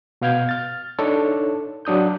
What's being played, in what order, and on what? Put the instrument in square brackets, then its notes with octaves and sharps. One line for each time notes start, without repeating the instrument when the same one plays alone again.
[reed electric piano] B2 B3 F5 F6 G6 G#6
F6 A6
D4 D#4 A4 C#5
F#3 D4 D#6 G6